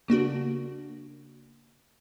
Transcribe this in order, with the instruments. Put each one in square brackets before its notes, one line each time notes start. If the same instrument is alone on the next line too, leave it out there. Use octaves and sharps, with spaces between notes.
[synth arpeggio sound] C#3 A#3 D4 F#4